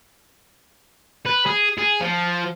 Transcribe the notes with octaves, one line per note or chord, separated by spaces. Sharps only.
B4
G#4
G#4
F3